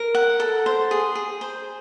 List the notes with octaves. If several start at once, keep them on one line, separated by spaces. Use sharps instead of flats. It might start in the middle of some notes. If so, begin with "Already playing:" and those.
Already playing: A#4
F#5
A4
C5
G#4
G#4
C5